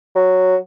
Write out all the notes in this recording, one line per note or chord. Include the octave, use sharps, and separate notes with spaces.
F#3